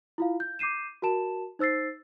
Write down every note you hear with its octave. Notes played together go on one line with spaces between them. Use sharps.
E4 F4 F5
G6
D6 G6 C7 D#7 E7
F#4 A#4 A5 E7
D#4 C5 E6 A6 C7